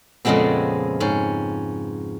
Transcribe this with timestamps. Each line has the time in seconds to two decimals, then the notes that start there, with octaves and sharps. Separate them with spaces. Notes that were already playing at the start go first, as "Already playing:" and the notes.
0.25 F2 A#2 C#3 G#3 B3 C4
1.00 G#2 C#4